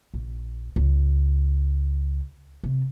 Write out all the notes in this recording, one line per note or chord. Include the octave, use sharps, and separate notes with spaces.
A#1
C#2
C3